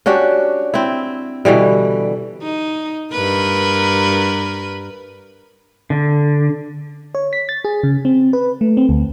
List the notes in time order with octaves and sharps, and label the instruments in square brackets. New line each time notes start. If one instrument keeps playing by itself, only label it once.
[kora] C#4 D4 F#4 G4
C4 E4
B2 D3 E3 G3
[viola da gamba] D#4
G2 A#4 B4
[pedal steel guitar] D3
[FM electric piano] C#5
B6
A6
G#4
C#3
C4
B4
A3
C4
D2